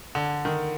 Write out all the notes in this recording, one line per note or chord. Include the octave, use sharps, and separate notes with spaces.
D3
D#3